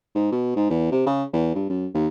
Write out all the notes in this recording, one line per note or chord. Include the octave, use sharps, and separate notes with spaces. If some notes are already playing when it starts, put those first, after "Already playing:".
G#2
B2
G#2
E2
C3
C#3
E2
G2
F#2
D#2